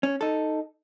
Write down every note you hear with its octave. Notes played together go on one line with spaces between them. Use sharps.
C#4
D#4 A4